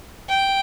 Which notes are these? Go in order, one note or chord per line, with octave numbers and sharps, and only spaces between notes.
G5